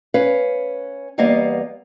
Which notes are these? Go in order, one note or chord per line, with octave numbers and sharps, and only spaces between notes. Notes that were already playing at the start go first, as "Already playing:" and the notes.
C#4 B4 F5
E2 G3 A#3 B3 D#5 F5